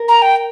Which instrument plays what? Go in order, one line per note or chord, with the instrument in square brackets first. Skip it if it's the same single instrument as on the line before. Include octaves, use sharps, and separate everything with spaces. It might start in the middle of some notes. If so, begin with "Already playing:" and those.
Already playing: [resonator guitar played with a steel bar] A#4
[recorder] A#5
G5